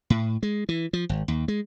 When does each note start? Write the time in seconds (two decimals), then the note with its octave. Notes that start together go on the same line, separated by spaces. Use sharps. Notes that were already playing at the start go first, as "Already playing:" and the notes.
0.10 A2
0.43 G#3
0.69 E3
0.93 F3
1.09 G#1
1.28 D#2
1.48 G#3